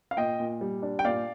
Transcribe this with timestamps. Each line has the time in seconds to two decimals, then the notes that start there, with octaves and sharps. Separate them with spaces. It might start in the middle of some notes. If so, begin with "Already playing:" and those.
0.11 F5
0.17 A#2 D#5 G5
0.40 A#2
0.61 G3
0.83 D4
0.99 G5
1.05 A#2 D5 F5